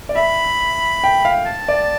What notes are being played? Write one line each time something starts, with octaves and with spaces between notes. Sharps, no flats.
D5
E5 B5
G5
F5
A5
D5